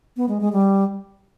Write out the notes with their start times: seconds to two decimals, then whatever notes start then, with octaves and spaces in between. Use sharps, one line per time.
0.17 B3
0.29 G#3
0.41 G#3
0.53 G3